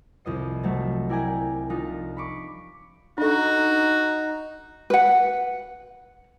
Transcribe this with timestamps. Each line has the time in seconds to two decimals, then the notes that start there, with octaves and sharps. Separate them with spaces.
0.25 C2 F2 D#5 C7
0.63 C3 F3 F#3 A3
1.09 E4 A#4 D5 G5 G#5 A#5
1.69 F3 A3 D4 D#4 F4
2.17 B5 C#6 D6
3.18 D4 D#4 F#4 A4
4.90 B4 F#5